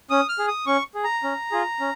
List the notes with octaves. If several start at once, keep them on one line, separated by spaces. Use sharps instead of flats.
C#4 D#6
F6
G#4
D#6
C#4 C#6
G#4
A#5
C#4
F4 G#4
C#4